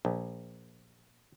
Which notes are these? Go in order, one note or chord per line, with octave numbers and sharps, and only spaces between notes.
A#1